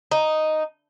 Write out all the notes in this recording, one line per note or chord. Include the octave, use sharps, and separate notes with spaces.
D#4